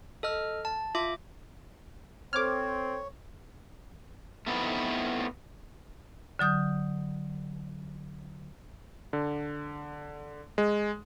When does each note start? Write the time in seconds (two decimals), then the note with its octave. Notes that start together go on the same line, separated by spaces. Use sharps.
0.23 A4 D#5 F6
0.65 A5
0.95 F4 E5 D6
2.33 C4 A4 C5 C#5 D6 F6 G#6
4.47 A3 B3 C4 D#4 E4 B4
6.39 D3 F#3 D#6 G6
9.13 D3
10.58 G#3